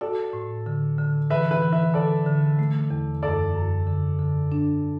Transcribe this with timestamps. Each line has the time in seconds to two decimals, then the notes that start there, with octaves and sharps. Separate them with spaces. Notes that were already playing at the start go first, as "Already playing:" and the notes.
0.01 F#4 A4 D5
0.33 A2
0.66 D3
0.98 D3
1.30 E3 B4 E5
1.51 B4 E5
1.62 E3
1.73 B4 E5
1.94 D3 A4 D5
2.26 D3
2.59 A3
2.91 E2
3.23 F#2 A4 D5
3.54 F#2
3.87 D3
4.19 D3
4.52 D4